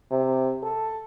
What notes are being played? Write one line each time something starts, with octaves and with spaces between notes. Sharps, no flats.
C3
A4